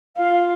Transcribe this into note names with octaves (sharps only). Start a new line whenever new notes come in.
F4 F5